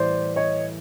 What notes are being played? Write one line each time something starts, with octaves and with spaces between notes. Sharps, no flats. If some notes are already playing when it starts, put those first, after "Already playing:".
Already playing: A2 E3 G3 C5 D5
C#5 D#5